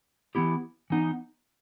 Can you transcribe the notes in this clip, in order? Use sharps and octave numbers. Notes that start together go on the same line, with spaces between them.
E3 B3 E4 G4
E3 B3 D#4